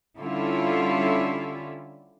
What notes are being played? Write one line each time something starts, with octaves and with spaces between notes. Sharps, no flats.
D3 G3 C#4 E4 F4 A4